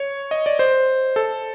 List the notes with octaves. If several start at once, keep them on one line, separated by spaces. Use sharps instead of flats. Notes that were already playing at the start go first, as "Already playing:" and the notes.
Already playing: C#5
D#5
D5
C5
A4